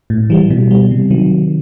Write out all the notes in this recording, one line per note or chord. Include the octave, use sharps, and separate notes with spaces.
A2
E3 G3
B2
G3
C3
D#3 F#3